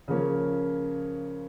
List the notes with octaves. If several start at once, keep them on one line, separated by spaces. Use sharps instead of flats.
C#3 F3 A#3 C#4